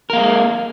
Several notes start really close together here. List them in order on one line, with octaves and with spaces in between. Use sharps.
A#4 A#3 G#3